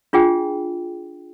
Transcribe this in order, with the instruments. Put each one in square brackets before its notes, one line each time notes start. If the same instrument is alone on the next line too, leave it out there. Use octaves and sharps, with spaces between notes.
[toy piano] D4 F4 G#4 G5